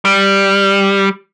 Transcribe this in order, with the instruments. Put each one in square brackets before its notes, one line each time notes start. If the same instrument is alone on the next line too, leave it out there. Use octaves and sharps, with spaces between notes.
[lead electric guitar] G3